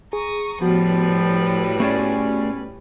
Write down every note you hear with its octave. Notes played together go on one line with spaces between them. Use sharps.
G#4 A#5 C#6 D#6
A2 F3 G3 B3 F#4 B4
A3 C#4 G#4 D5